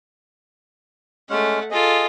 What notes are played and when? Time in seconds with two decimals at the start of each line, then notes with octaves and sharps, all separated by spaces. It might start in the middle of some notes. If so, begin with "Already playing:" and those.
1.30 G#3 A3 C#4 F#5
1.71 F4 G#4 A4 D#5